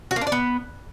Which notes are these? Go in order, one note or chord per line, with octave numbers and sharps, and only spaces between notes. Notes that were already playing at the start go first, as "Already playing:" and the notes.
F#4
A#3
D4
D5
B3